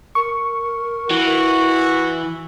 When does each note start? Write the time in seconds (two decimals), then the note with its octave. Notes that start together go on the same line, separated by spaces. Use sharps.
0.15 A#4 C#6
1.10 E3 F#4